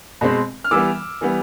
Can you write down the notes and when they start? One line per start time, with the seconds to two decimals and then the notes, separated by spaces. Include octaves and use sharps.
0.21 B2 G#3 C4
0.64 F6
0.71 E3 G3 B3 D6 E6
1.21 E3 G3 B3